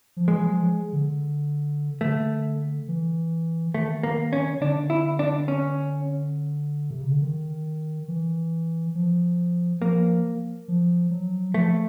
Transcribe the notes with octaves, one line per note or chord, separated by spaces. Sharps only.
F3
E3 G#3
F#3
F3
D3
D3 A3
E3
D#3 A3
A#3
C#4
D3 D4
E4
D4
C#4
C3
C#3
D3
D#3
E3
F3
F3 A#3
F3
F#3
F3 A3